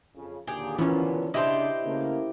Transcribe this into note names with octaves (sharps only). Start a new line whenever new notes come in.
F2 C#3
D#2 A#2 D3 G4 G#4
E3 F3 B3 C#4
C#3 D4 E4 G4 C5 D#5
C#3 A3 A#3